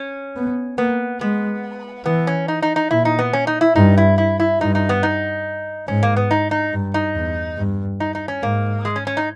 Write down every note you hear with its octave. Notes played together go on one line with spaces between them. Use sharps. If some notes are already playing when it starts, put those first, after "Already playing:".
Already playing: C#4
B3
A#3 B3
G#3 B3
E3 B3
C#4
D#4
D#4
D#4
A#2 E4
D#4
B3
C#4
D#4
E4
G2 D#4
E4
E4
E4
G2 D#4
D#4
B3
D#4
G#2 C#4
A#3
B3
D#4
D#4
G2
D#4
E2
G2
D#4
D#4
C#4
G#2 A#3
G#3
C#4
C#4
D#4